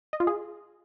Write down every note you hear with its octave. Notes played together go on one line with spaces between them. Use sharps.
D#5
F4
G#4